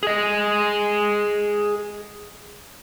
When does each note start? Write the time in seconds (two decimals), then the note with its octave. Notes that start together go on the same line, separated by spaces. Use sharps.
0.03 G#4 D#5